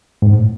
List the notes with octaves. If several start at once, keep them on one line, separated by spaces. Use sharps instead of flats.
G#2
A2